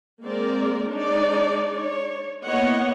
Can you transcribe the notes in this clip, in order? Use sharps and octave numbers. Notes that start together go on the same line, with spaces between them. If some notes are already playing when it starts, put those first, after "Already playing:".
G#3 A#3 C4 A#4 D5
G#3 D4 D#4 C#5 D5
C#5
A#3 B3 E4 C#5 D#5 F#5